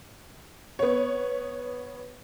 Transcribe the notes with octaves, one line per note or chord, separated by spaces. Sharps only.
B3 C#5